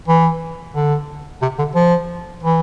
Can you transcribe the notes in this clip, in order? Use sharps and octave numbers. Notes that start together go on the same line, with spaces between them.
E3
D3
C3
D3
F3
E3